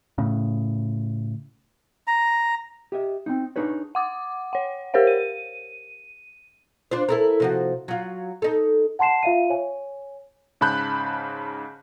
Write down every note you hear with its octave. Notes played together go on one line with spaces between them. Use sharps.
A2 C#3
A#5
G4 D#5 E5
C4 D4 D#4
D4 D#4 G#4 B4 C#5
F#5 D6 D#6
C#5 F#5
G4 A#4 C5 C#5 F5
D#7
D4 F4 C5
E4 A4 A#4
C3 F3 F#4
F#3 F4
D#4 A4
F#5 A5 C6 C7 E7
F4 E5 F5 D#7
C#5 G#5
G#2 C#3 A5 B5 F#6 G6